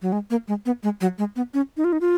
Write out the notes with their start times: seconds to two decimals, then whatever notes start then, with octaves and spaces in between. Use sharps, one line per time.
0.02 F#3
0.12 G#3
0.30 A#3
0.48 G#3
0.66 B3
0.83 G#3
1.01 F#3
1.18 G#3
1.36 B3
1.54 C#4
1.77 D#4
1.84 F4
1.93 D#4
2.01 F4